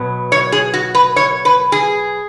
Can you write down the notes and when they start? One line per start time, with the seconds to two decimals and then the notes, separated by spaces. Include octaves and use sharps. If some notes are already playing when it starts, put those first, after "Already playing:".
Already playing: B2 F#3 B3
0.32 C#5
0.52 G#4
0.74 F#4
0.95 B4
1.16 C#5
1.45 B4
1.72 G#4